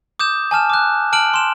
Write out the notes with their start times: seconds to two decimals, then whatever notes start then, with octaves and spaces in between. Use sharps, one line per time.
0.19 D6 D#6 G6 E7
0.51 G#5 A5 F6 E7
0.70 D6 F#6
1.13 A5 F6 D7 F#7
1.34 C6 E7